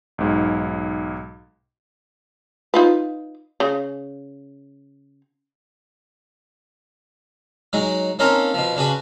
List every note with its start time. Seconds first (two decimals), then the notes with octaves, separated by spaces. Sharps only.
0.18 B1 G#2
2.74 D#4 F4 B4
3.60 C#3
7.73 F#3 G#3 D#4
8.19 A#3 C4 C#4 D#4 A4 A#4
8.54 B2 F3
8.76 C#3 D4 F#4 G#4 B4